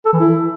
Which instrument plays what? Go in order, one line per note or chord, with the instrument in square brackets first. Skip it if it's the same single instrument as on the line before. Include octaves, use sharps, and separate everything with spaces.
[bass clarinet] A4
E3
E4